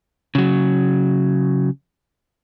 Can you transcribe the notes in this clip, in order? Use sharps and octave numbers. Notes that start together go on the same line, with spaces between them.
C#3 F#3